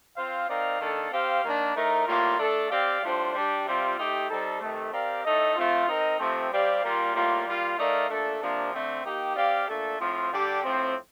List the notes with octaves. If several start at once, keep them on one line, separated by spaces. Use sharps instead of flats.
C4 F4 C5 F5
C4 D#4 A#4 D5 F5
D#3 A#3 D4 A4
C4 G4 C5 F5
D#3 A#3 D4
A2 A3 D#4 A#4
A2 G3 A#3 F4
A3 D4 A4
C4 G4 D5 F5
A2 G3 D4 F4 C5
G3 D4 G4
C3 G3 C4 F4
A3 D#4 G4 C5
G3 C4 D#4 A4
C3 D#3 A3
C4 G4 A#4 D5 F5
A2 A3 D#4 A4 D#5
F3 A3 C4 F4
C4 D#4 A#4 D#5
C3 F3 A3 C4
G3 C4 G4 D5 F5
A#2 G3 A#3 F4
A2 G3 A#3 F4
G3 A#3 F4
A3 D#4 A#4 D5 F5
A#2 A3 D4 A4
C3 F3 A#3 D4 F4
D3 A3 C4
A#3 D#4 G4
C4 G4 D5 F5
A#2 A3 D4 A4
A2 F3 C4 F4
D3 G3 D4 G4 D5
A2 F3 C4